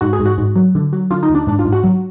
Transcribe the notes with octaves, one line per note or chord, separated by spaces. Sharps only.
G#2 F#4
G#4
G#2
F#4
G#2
F#3
D3
F#3
D3 F4
D#4
D#2
D4
G#2 D4
F4
G#2
F#4
F#3